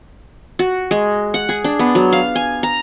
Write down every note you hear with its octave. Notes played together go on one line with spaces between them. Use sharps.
F#4
G#3
F#5
G#4
D4
B3
F#3
F5
G#5
A#5